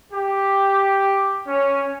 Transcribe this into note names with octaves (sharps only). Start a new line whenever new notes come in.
G4
C#4